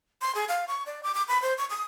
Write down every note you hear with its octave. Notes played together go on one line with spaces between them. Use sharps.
C6
G#4
F5
C#6
D5
D6
D6
B5
C5
C#6
D#6